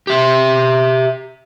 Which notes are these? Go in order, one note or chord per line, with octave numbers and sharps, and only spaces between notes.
G4 E5